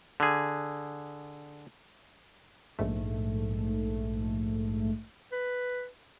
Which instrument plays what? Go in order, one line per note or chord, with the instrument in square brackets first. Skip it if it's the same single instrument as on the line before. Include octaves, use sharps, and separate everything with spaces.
[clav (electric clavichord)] D3 G#4
[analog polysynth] A#1 G#2 A3
[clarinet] B4